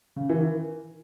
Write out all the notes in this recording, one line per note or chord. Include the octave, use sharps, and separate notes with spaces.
C#3
E3
D#3